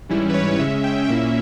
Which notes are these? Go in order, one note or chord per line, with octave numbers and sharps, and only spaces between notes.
G#2 E3 G3 C#4 E4
B4
C#5
C#3 G#3 C#4 E5
G5
G5
A#2 A#3 C#4 E4 E5